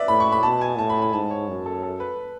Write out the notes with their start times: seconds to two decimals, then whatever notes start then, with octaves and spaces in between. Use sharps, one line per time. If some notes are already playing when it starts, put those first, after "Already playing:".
Already playing: B4 D5 E5
0.08 A2 B5
0.20 C#6
0.32 B5
0.43 B2 A5
0.61 G#5
0.78 A2 A5
0.90 B5
1.02 B5
1.13 G#2 A5
1.31 C#5
1.48 F#2
1.66 A4
1.83 A4
2.00 B4